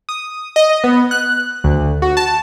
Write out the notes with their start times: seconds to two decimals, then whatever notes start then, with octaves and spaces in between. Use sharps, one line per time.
0.09 D#6
0.56 D#5
0.84 B3
1.11 F#6
1.64 D2
2.02 F#4
2.17 A5